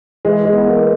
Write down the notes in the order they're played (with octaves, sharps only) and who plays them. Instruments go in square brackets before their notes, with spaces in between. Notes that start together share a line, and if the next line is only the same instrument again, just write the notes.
[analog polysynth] E3 [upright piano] G#3
[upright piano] G#3
[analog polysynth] B3
[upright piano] A#3